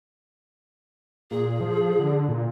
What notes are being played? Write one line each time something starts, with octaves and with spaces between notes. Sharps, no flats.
A#2 G#4
F3
D3
A#2